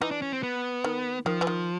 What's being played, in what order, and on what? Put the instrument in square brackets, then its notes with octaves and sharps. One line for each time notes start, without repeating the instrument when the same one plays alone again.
[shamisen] E3 [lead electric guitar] D#4
[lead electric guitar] D4
C#4
C4
B3
[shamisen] D#3
[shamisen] D#3 [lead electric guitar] F3
[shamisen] E3
D#3